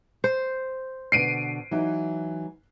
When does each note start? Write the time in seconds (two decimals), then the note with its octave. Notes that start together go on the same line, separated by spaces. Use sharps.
0.24 C5
1.12 B2 D3 D5 C7 D7 D#7
1.71 E3 F#3 D#4